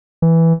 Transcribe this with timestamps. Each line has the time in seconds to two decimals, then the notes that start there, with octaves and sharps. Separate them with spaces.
0.22 E3